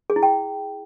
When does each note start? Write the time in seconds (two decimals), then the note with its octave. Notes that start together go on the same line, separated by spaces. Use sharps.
0.10 G#4
0.16 E4
0.23 G5